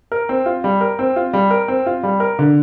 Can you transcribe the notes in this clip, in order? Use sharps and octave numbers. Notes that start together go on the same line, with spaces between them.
A#4
C4
F4
G3
A#4
C4
F4
G3
A#4
C4
F4
G3
A#4
D3